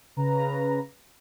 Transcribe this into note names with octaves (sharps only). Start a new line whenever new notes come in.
C#3 B4 A#5